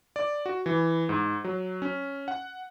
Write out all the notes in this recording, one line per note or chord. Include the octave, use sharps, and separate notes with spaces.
D5
F#4
E3
G#2
F#3
C#4
F#5